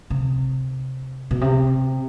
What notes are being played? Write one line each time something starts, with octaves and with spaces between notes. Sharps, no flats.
C3
B2
C3